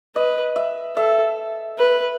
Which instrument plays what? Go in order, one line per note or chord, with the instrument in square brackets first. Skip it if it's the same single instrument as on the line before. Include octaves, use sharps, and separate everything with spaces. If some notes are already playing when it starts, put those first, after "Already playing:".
[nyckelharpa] B4 [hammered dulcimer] D#5
[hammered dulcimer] E5
[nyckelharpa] A4 [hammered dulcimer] E5
[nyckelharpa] B4